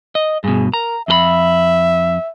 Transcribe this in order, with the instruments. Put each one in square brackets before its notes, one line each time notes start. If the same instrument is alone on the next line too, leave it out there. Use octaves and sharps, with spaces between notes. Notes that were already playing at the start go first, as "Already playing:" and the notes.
[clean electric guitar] D#5
[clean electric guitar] G2 B2 [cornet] G#4
[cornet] A#4 [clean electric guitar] A#5
[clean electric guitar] F2 A4 B5 [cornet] E5